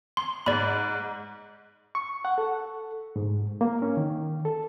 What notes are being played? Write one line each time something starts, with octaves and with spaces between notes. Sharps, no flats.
C6
G#2 D5 B5
C#6
F#5
A4
G#2
A#3
C#4
D#3
A4